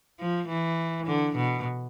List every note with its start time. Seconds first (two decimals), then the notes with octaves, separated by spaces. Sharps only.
0.20 F3
0.48 E3
1.07 D3
1.36 B2